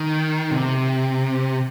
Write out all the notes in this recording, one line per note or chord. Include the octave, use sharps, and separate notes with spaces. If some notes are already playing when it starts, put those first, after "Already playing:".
Already playing: D#3
C3